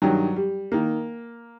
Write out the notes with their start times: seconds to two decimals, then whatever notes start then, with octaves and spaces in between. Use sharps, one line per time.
0.02 G2 D#3 F#3
0.36 G3
0.72 D#3 A#3